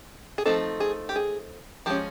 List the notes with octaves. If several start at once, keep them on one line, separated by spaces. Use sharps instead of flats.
G#4
F3 A3 C4 D#4 A4
G#4
G4
G#4
F3 G#3 C#4 G4